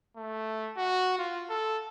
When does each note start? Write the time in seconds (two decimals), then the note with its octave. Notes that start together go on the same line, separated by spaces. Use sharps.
0.17 A3
0.77 F#4
1.19 F4
1.50 A4